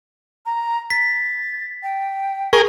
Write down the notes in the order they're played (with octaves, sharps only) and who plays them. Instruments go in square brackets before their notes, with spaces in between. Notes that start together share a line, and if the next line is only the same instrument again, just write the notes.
[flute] A#5
[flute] A6 [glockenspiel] B6
[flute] G5
[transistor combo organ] G#4 A#4 [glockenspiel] C#6